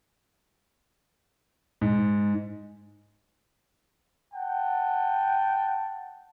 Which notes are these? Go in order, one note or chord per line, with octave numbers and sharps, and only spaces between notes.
G#2
F#5 G5 A5